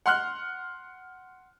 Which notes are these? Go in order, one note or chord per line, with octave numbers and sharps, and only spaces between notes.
F#5 C6 F6 F#6